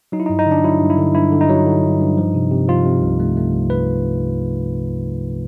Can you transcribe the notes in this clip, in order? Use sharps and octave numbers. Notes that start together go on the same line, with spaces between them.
F#3 D#4
E4
G2 D#4
D#4
D3
D4
F#3 E4
G2
E4
D3
G2 E4
D3
D#4
F#3
D3
G2
G2
F3
C3
C3
F3 F4
C3
C2
A3
A3
C2
B4